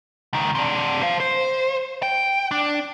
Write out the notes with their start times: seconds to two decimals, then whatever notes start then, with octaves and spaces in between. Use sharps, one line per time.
0.33 C#2 D#3
0.55 C3 D4
1.02 C5 F5
1.20 C5
2.03 G5
2.51 D4